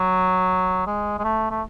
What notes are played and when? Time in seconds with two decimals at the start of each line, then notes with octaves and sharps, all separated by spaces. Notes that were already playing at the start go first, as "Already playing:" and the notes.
Already playing: F#3
0.87 G#3
1.19 G#3
1.24 A3
1.51 A3